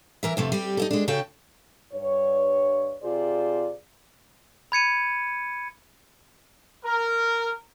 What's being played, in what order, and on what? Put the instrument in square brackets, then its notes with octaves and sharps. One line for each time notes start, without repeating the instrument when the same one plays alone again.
[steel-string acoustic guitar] E3 A#4 E5
F2 C3 A3
G3 C4 G4
D#4 E4 A4
G#3 D4
C#3 F#4 A4 G5
[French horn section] G2 C#5
C3 F4 G#4 C5 D5
[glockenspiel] B5 G#6 C#7 D#7
[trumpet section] A#4